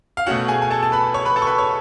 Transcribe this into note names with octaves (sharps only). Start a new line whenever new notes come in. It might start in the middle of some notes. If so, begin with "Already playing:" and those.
F5
B2 A3 C#4 F#4 F#5
G#4 G#5
G#5
A4 A5
A5
B4 B5
C#5 C#6
B4 B5
A4 A5
C#6
B4 B5
C#5 C#6